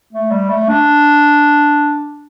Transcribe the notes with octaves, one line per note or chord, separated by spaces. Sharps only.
A3
G3
A3
D4